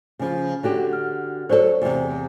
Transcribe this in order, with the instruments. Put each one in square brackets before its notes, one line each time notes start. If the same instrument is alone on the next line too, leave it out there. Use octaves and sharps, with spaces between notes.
[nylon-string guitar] C#3 F3
D3 F#4 G4
[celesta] F6
[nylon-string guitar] F#3 A4 [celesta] C5 D5
[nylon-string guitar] E2 C3